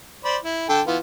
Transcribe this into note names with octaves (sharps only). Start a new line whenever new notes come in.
C5 D5 B5
E4
D3 A4 G5
E3 B3 F4